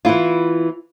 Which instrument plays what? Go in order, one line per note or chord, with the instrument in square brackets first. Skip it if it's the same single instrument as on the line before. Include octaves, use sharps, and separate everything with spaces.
[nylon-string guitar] E3 B3 E4 F4